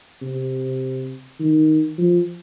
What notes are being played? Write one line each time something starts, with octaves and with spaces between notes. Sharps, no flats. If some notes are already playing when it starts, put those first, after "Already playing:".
C3
D#3
F3